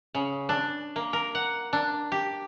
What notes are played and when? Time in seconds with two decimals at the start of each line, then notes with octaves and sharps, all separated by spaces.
0.15 C#3
0.49 D4
0.96 A#3
1.13 A#4
1.35 F#5
1.73 D4
2.12 G4